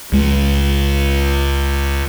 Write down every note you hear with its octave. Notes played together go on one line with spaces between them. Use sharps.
C#2 G#3